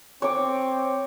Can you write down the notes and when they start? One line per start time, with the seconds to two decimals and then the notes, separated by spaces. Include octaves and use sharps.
0.22 C4 C#5 D6